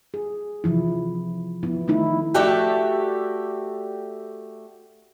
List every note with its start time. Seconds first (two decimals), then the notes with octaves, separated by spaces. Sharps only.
0.14 G#4
0.64 C3 E3 F3 E4
1.63 F3 B3 E4
1.88 D#3 A3 D#4 E4
2.34 A3 F#4 G4 A4 D5 E5